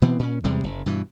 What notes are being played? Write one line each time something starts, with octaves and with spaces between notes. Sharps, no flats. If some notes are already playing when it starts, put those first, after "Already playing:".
B2 E3 B3 C4
A#2 C#4
E2 C3 G3 G#3
F#1
G2 B2 E3